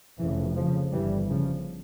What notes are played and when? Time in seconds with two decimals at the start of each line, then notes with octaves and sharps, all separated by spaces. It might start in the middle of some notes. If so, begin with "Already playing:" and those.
0.19 F1 F2 C#3 E3
0.56 C#3 F3
0.93 G1 G2 E3 G3
1.29 C#3 F3